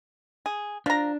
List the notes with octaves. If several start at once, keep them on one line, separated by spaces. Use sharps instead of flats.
G#4
F3 D4 A#5